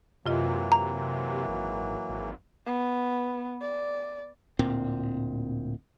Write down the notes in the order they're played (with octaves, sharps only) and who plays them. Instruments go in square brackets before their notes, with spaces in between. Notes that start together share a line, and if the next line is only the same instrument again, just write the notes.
[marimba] F#2 F4 D#5 [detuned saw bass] C3 [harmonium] E3 F#3 A#3
[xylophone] A#5
[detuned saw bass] G#1
G#1
[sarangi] B3
D5
[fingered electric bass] D1 A#2 C4